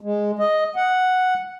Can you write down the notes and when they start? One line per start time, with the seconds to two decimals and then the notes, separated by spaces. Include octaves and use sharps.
0.01 G#3
0.39 D#5
0.76 F#5